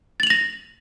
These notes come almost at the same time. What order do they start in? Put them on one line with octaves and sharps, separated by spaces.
A6 F#7 F7 A#6